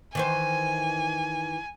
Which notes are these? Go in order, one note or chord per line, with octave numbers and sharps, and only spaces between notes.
D#3 E3 C5 G#5